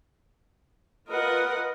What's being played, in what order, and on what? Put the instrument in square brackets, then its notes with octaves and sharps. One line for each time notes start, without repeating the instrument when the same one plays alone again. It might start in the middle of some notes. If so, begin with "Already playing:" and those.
[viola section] F4 B4 D#5 [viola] A#4 F#5